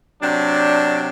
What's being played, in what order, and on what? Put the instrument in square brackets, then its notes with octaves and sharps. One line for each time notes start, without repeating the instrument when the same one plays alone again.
[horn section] C3 F#3 D4